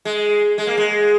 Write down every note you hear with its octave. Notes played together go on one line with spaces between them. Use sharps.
G#3
G#3
A#3
G#3